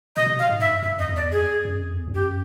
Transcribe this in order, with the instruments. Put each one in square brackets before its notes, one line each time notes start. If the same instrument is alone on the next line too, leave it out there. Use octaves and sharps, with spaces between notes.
[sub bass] B2 [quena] D#5
[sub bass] C3
B2
[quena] F5
[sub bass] G#2
[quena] E5
[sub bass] G2
[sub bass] G2 [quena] E5
[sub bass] F2 [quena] D#5
[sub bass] F2
[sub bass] E2 [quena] D5
[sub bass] F2 [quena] G#4
[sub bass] F#2
F2
E2
G2
[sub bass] F#2 [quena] G4